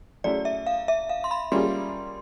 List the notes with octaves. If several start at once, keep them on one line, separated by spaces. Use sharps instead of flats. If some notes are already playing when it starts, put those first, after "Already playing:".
F#3 A3 C#4 E4 G#4 D5
E5
F5
E5
F5
C6
B5
G3 A#3 C#4 F4 G#4 C6